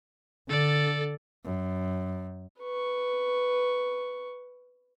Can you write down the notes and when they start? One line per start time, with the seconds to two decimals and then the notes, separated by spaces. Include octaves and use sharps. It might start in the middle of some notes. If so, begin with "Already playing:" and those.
0.49 D3 A4 D5
1.45 F#2
2.61 B4 C#6